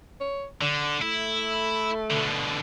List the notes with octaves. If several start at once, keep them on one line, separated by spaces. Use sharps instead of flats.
C#5
D3 D5
A3 E4
B2 D3